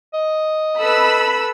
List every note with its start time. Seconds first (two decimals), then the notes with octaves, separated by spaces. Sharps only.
0.14 D#5
0.79 A4 B4 B5 E6